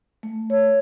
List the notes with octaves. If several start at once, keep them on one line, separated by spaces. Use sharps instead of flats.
A3
C#5